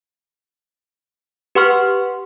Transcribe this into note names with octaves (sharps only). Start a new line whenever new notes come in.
G4 B4 F#5 C6 C#6 F6